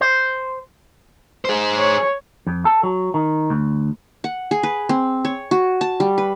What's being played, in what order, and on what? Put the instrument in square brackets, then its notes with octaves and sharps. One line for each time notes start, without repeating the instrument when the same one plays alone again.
[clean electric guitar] C5
[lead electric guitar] G#4 C5
[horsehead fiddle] C#5
[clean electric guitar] F2
A4
F#3
D#3
D2
[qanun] F#5
G#4
B4
C4
C#5
F#4
A5
G3
B4